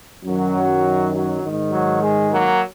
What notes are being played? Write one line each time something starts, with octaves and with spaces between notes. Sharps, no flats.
F#2 D#3 F#3
F#3
G#2 D#3
F#3
G#3
F#3 A#3